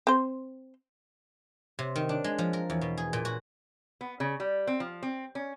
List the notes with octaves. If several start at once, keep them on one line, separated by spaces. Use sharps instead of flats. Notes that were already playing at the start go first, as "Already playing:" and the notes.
C4 C5
C3
D#3
D4
G#3
F3
A#4
E2
B2
G#4
A#2
F#4
B3
C#3
G3
C4
F3
C4
C#4